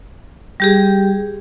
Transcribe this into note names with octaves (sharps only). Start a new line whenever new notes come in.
G3 G4 G#4